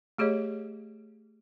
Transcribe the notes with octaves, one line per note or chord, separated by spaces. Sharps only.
A3 G4 G#4 C#5 D#5